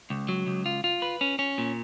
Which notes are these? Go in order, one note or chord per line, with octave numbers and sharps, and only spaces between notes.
C#2
F#3
C#2
F4
F4
B4
C#4
C#4
A#2